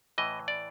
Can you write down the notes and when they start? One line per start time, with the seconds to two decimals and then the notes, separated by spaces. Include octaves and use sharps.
0.18 A2 E3 D#5
0.48 D5